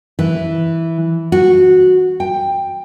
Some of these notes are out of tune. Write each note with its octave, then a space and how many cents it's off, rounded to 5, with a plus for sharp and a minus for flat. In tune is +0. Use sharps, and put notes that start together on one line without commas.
E3 -5
F#4 -10
G5 +10